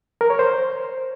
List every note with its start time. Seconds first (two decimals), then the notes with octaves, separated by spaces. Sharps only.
0.21 A#4
0.30 C#5
0.39 C5